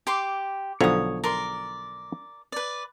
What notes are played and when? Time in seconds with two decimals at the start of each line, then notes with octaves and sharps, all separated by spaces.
0.07 G4 C6 D6
0.81 B1 D3 F3 C#5 D#6
1.24 A#4 D5 C6
2.52 B4 D5